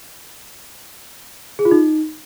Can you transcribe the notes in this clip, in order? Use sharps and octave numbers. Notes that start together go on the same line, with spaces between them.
G#4
F4
D#4